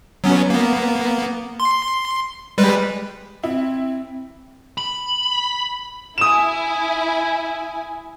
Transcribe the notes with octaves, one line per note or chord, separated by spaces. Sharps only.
F#3 B3 C#4
A#3 B3
C6
G3 G#3 B4
C4 E4
B5
E4 G#5 D#6 E7